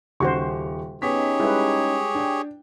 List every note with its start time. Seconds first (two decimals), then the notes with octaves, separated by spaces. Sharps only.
0.20 D#1 C#3 F#4 G4 C5 C#6
1.02 B3 C#4 D#4 G4 G#4 C#5 B6
1.40 G3 G#3 E4 B4
2.15 D4 G5